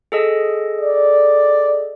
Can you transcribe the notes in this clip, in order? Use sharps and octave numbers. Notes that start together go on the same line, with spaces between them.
G#4 A4 D#5
D5